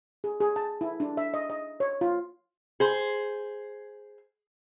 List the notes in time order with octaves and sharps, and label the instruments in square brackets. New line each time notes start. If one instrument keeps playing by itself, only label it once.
[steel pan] G#4
G#4
A5
E4
D4
E5
D#5
D#5
C#5
F4
[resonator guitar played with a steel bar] G#4 C5